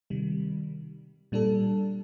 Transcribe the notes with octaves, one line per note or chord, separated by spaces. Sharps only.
C3 D#3 G3
A#2 G3 D4 A4